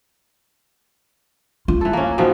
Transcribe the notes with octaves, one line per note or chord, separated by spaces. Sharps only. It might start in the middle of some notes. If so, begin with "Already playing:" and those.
F4
E3 A4
A#3 C#4
B2 D#3 F3